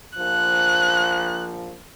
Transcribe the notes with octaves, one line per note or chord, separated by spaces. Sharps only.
A#1 F3 F#6